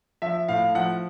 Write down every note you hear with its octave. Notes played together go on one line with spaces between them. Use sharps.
F3 E5
A2 F5
F3 F#5